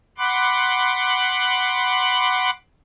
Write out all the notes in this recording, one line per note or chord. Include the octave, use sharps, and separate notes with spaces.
F#5 B5 C6 D6 F#6